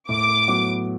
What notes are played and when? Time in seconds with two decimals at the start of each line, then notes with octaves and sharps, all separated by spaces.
0.09 A2 D6
0.48 F#3 B3